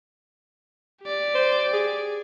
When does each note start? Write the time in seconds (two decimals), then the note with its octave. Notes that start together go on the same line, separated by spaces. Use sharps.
1.02 G4 D5
1.35 C5
1.73 G#4